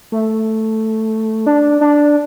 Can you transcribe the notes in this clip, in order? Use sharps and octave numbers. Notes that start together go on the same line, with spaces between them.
A3
D4
D4